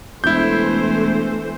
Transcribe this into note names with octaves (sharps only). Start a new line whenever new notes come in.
E1 E3 A3 E4 C5 G6